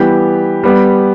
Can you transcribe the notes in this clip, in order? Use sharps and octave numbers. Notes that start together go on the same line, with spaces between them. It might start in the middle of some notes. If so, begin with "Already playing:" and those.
Already playing: E3 G3 B3 G4
G3 B3 G4